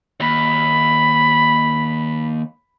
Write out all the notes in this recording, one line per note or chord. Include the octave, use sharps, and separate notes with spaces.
D#2 B5